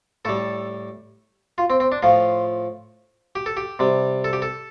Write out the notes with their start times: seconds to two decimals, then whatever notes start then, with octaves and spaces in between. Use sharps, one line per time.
0.25 A2 G3 A4
1.58 F4
1.70 C4
1.80 C4
1.92 D4
2.02 A2 F3 F4
3.35 G4
3.46 A4
3.57 G4
3.79 C3 G3
4.24 A4
4.33 G4
4.42 A4